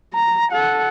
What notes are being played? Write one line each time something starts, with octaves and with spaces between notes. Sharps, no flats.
A#5
A4 F#5